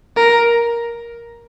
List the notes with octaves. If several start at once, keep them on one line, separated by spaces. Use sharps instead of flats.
A#4